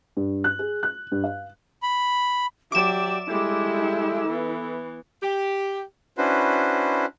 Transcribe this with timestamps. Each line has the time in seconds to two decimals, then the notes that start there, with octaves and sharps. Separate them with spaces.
0.17 G2
0.44 F#6
0.59 G#4
0.83 F#6
1.12 G2
1.24 F5
1.83 B5
2.72 F#3 G4 D5 E5 D6 E7
3.28 G3 G#3 E4 A4
4.27 E3 B3
5.23 G4
6.18 C#4 D4 E4 F#4 B4 C5